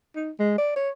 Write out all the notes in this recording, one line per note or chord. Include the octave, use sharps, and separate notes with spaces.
D#4
G#3
D5
C#5